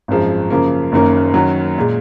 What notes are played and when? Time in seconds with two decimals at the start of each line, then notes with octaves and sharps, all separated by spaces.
0.08 G#1 F#2 F3 G#3
0.50 F#2 C#3 F3 A#3
0.92 F#1 F#2 D#3 A#3 C#4
1.34 F#2 D#3 F#3
1.78 A#2 G#3